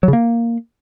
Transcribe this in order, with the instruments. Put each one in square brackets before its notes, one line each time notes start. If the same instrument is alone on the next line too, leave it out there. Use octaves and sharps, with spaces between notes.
[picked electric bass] F#3
C#3
A#3